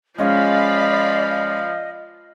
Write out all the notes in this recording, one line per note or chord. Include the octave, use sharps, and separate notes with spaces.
F3 G#3 C#4 F4 D5 D#5 F5 B5